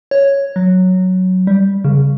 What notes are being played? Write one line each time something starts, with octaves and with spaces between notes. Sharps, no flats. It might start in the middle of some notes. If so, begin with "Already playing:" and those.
C#5
F#3
G3
C#3